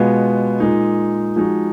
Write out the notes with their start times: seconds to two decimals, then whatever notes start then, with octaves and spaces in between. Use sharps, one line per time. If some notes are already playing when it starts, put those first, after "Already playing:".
Already playing: B2 G#3 B3 F4
0.60 A#2 G#3 D#4
1.36 F3 G#3 D#4 F#4